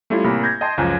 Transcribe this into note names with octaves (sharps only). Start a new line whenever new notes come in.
G3 A3 C#4 E4 F4
A1 C3 A#3 B5
G6 G#6 A#6
D#5 G5 A5 C6
C#2 F#2 F3 C#4 G#5